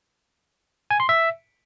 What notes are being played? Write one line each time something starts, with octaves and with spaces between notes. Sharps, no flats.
G#5
C6
E5